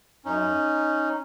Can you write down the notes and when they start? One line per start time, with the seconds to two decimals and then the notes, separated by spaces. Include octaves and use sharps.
0.25 F#2 C#4 D#4